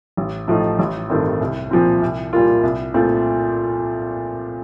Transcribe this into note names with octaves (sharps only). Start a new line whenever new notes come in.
A1
A2 F3 A3 D#4
A1
G2 D#3 A3 C4
C2
A#2 F3 C4
C2
A#2 G3 A#3 F4
C2
A#2 A3 C4 F4